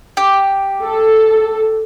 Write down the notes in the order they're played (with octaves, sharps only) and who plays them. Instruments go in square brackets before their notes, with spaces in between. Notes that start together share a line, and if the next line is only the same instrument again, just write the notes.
[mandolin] G4
[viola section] A4